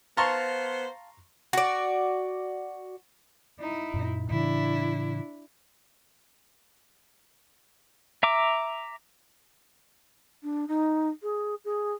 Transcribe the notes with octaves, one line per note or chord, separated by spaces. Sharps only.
B3 C5 F5 A5 A#5 C6 C#6
F#4 D5
D#4 E4
F#2 A#2
A2 C#3 E3 D4 E4
E5 A#5 D6
D4
D#4
G#4
G#4